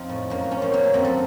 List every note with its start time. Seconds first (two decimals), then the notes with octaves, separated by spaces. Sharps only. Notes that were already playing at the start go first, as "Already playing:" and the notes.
Already playing: F2 F3 C4 D#4
0.09 A2
0.30 F#2 A#3
0.51 F3 C#4
0.62 C4
0.73 F#2 A#3
0.84 A#3
0.93 F#2 C4
1.04 A4